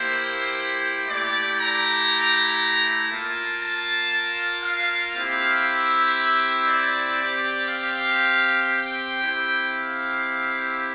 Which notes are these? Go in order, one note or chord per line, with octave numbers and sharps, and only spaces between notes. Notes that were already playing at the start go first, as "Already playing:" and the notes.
Already playing: A#3 E4 G4 C5
A3 E4 G4 D5
A#5
A#3 F4 A5
A5
F5
C4 E4 G4
E5
D5
C4 G4
F5
G5
C4 E4 G4
F5